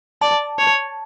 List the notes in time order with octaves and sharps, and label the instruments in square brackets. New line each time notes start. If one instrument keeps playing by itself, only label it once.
[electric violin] D5 [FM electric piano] A5
[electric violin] C#5